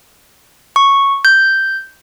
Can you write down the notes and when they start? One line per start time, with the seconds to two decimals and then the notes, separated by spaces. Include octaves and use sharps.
0.76 C#6
1.25 G6